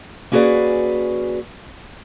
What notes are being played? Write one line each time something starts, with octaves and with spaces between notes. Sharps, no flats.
A#3 C#4 F#4 G#4 B4 D5